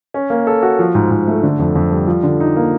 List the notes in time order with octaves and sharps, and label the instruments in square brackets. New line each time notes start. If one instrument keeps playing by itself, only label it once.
[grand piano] C#4
A#3
A4
F#4
F3
G#2
G#2
A3
D3
F2
F2
G3
F3
D3
D#4
A#3